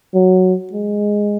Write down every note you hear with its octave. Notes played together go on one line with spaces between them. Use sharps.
F#3
G#3